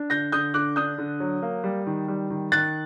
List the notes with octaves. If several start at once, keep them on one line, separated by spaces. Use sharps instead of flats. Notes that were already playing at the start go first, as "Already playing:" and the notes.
Already playing: D4
D3 G6 A#6
D3 D#6 G6
D3 D6 F#6
D4 D#6 G6
D3
F#3
A#3
G3
D#3
G3
D#3
D#3 F#6 A6